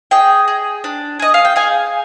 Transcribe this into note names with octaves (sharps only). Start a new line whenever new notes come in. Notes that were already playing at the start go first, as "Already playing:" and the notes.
G#4 D#5 G5
G#4
D4
G#4 D#5
F5
G5
G#4 F5 G#5